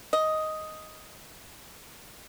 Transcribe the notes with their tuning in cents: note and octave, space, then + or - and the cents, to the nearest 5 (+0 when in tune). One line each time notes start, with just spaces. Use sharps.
D#5 +5